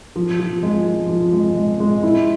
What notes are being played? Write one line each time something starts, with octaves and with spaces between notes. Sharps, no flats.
F3
F3
G#3
F3
F3
G#3
G#3
G#3
E4